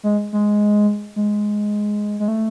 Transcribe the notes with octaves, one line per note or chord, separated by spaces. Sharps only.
G#3
G#3
G#3
G#3
A3